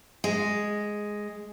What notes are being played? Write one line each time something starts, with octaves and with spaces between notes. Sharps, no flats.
G#3